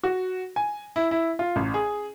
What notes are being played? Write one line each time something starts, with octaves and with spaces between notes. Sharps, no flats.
F#4
G#5
E4
E4
F4
A1
G#4